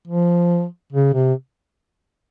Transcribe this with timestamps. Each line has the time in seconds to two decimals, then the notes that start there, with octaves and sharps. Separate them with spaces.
0.07 F3
0.93 C#3
1.14 C3